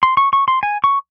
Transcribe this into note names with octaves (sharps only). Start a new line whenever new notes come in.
C6
C#6
C#6
C6
G#5
C#6